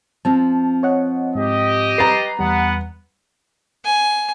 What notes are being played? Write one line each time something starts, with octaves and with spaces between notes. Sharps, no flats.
F3 C4 A5
C#5 D#5 F#5
G#2 G4 D#5
B4 A#5 A6 A#6 C7
E2 G3 B3 F#5
G#5